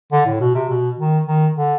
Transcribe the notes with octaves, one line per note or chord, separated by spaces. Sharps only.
D3
A2
B2
C3
B2
D#3
D#3
D3